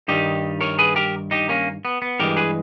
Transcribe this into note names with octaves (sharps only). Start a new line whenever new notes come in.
G2 D#3 G3 D#4 G4
A#4 C#5
G#4 B4
G4 A#4
D#4 G4
A#3 C#4
B3
B3
G2 E3 G#3 G4 A#4
G#4 B4